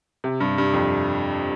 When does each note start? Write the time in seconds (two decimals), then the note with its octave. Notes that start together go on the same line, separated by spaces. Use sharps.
0.24 C3
0.40 G2
0.58 G2
0.73 F2